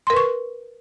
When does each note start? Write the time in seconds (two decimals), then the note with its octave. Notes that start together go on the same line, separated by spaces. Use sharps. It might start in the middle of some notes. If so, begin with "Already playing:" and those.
0.07 C6
0.10 A#4
0.13 B4
0.17 C#6